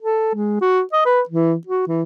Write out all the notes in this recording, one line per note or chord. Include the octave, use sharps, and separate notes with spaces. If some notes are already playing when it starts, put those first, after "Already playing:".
A4
G#3
F#4
D#5
B4
E3
F#4
E3